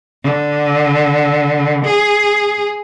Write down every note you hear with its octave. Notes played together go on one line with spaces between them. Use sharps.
D3
G#4